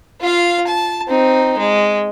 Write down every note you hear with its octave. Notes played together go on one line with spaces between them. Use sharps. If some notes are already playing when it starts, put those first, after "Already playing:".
F4 F5
A5
C4 D#4
G#3